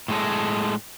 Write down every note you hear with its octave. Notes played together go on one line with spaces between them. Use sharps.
A2 G#3 A4